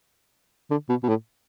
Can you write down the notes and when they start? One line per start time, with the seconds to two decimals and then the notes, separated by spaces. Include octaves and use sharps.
0.71 D3
0.89 B2
1.03 B2
1.09 A2